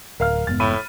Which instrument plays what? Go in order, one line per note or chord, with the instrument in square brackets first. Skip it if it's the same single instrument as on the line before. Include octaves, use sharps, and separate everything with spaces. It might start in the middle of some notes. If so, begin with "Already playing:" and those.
[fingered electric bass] D1 [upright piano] A#4 F5 F6
[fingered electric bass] F1 G#2 B3 [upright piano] A6
[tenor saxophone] A2 [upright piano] B5 D#7